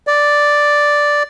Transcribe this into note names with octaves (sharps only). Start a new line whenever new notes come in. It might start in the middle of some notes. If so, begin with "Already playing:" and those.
D5